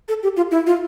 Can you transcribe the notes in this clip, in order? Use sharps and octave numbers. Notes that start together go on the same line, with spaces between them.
A4
G4
F4
E4
F4